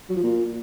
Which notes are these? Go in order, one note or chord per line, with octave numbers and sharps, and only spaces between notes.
F#3
F3
A#2